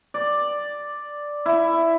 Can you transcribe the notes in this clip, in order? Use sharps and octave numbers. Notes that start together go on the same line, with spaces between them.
D5
E4